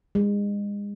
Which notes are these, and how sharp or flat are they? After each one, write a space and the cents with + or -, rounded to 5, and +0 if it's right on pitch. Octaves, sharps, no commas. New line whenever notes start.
G#3 -30